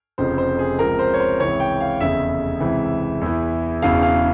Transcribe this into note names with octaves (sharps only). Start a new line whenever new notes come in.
F1 F2 C#3 F3 C5
C5
G#4
C#2 C3 F3 A#4
C5
C#5
C5
C#2 C3 E3 C#5
G5
F5
F1 E2 C#3 E5
C#2 C3 E3
E2 E3
E1 E2 C#3 E3 F5
F5